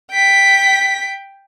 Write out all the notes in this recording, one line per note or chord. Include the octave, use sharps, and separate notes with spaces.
G5 B6